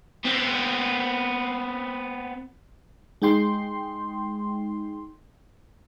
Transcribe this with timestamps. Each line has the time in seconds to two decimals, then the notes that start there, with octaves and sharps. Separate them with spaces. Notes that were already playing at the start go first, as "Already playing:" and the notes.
0.24 B3 C4
3.22 G#3 D#4 G5 C6